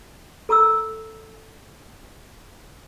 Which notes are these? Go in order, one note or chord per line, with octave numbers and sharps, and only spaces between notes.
A4 A#5 D#6 E6